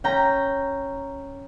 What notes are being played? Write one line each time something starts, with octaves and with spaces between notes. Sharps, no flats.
C#4 G5 A#5